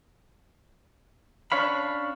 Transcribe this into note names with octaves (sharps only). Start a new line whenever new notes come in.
C#4 D4 C#5 F5 B5